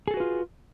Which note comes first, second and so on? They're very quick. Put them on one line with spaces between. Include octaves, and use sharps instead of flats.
G#4 A4 F#4 B4 F4